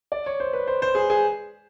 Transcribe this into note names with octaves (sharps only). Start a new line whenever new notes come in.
D5
C#5
C5
B4
C5
C5
G#4
G#4